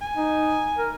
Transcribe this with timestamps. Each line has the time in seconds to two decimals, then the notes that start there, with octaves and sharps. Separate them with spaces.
0.01 G#5
0.17 D#4
0.78 A#4